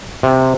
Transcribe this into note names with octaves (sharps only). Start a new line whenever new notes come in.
C3